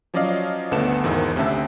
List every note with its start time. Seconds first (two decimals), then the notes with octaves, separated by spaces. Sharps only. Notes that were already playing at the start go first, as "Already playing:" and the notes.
0.14 F3 F#3 C#4 D5 D#5 F5
0.71 G1 D2 B3 A4 F#5 E7
1.04 G#1 E2 D#3 C5 E6
1.36 D2 C3 C#4 E5 A5